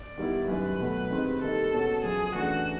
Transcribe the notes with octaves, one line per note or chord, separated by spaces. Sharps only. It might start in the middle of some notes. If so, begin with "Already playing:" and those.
Already playing: D5
D#3 G3 B3 E4
F#2 D#3 G3 B4
B1 B2 F#3 A3
D#3 G#3 C4 D#4 G4
D#3 G3 A#3 D#4 G4 A4
B2 G#3 C#4 F#4
F#2 C#3 F3 G#4
C#3 E3 A3 D4 F#4